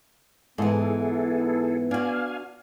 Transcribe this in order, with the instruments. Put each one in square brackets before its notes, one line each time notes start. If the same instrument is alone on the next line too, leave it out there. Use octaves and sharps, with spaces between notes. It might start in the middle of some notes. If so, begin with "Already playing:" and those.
[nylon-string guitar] G#2 E3 [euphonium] B3 [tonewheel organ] E4 G#4 A4
[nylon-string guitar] D4 F#4 [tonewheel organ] F5 G#5